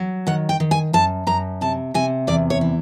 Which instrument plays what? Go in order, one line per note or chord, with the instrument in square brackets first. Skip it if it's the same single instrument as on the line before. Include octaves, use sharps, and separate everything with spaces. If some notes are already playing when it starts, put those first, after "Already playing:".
Already playing: [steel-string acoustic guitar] F#3
D#3 F#5
G5
D#3
G#5
F#2 A5
F#2 A#5
C3 A5
C3 G#5
E2 D5
C#5
E3